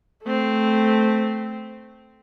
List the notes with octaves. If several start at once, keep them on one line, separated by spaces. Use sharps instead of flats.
A3 C4